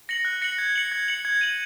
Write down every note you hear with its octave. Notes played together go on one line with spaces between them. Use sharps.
A#6 C#7 F#7
F#6
A#6 C#7 F#7
G#6
C#7 F#7
G#6
C#7 F#7
G#6
D#7 F#7